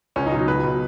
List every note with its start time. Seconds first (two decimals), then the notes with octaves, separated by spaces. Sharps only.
0.16 C#2 C#4
0.26 D#4
0.31 B2 F#3
0.47 C#2 B4
0.64 B2 F#3